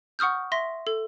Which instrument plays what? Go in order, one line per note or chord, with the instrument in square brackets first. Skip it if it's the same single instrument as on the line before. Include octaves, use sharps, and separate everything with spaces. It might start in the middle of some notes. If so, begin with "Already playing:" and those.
[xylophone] F#5 C#6 D#6 F6 G6
E5 C6 A#6
A4